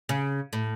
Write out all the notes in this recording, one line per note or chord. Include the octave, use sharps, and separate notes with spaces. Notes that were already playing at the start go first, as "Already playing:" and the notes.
C#3
A2